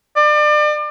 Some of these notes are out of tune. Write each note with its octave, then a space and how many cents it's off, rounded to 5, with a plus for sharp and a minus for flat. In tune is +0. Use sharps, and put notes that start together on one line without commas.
D5 +35